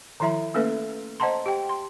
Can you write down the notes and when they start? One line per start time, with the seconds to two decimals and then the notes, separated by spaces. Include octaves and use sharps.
0.20 D#3 F3 E4 E5 A#5
0.54 A3 A#3 C#4 A4 B4 E5
1.20 C5 D#5 F#5 A5 A#5 C6
1.46 G4 G5
1.69 C6